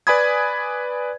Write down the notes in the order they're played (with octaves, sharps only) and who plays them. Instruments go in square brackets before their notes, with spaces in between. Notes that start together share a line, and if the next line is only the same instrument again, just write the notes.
[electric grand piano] B4 D5 G#5 B5 D#6 G#6